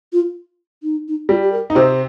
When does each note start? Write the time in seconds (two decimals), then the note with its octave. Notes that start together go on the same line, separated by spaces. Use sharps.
0.13 F4
0.83 D#4
1.08 D#4
1.29 G3 F4
1.43 G4
1.52 A#4
1.70 D#4
1.75 C3 C4 C5